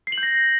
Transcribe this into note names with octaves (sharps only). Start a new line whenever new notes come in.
C7
F#7
G6
A#6